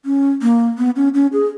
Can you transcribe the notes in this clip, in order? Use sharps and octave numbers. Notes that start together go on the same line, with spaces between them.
C#4
A#3
B3
C#4
C#4
G#4